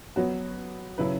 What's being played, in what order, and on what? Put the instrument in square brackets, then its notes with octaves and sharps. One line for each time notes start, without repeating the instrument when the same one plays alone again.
[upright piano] F#3 B3 F#4 C#5
C#3 F#3 E4 B4